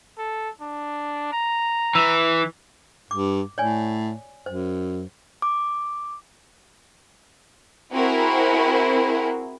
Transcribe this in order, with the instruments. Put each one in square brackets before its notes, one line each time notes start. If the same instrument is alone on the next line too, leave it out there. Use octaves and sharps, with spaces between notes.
[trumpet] A4
D4
A#5
[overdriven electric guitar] E3
[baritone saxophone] G2 [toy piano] D6
[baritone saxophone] A2 [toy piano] C#5 D5 G#5
[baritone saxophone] F#2 [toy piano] C5
[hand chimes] D6
[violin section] C4 E4 F#4 G#4 A#4